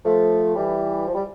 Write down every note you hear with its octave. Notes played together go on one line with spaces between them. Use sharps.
F3 A3
E3 G3
F3
G3